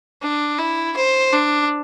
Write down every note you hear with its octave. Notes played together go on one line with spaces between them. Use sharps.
D4
E4
C5
D4